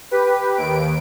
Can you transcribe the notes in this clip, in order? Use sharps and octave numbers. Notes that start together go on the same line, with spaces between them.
G4 B4
D#2 D7